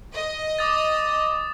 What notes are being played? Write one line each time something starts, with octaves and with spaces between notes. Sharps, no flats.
D#5
D6 D#6 A6